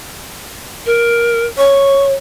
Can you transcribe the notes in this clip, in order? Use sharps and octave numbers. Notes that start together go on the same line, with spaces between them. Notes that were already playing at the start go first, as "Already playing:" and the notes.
A#4
C#5 C#6